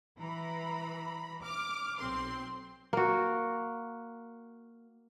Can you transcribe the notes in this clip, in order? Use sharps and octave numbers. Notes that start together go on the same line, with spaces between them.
E3 A#5 B5
D6 F6
B1 C4 C6
A#3 F#4